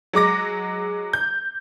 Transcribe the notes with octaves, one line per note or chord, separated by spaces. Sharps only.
F#3 G#3 D6 A#6
G6